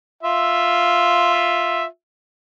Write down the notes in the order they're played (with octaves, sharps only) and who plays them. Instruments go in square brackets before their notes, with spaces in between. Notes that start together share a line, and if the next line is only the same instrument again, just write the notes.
[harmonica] F4 E5